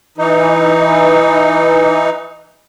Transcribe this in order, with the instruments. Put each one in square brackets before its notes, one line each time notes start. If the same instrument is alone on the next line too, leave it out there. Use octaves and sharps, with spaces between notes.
[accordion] E3 D#4